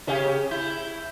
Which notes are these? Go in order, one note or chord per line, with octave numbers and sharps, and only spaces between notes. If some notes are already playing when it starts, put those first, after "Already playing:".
C#3 C#4 G4 G#4
E4 G6